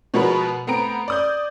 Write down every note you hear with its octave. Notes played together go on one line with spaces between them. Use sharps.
B2 F3 G#3 B3 A#4 B4
A3 B3 C4 A#5 D7
D5 D#6 G6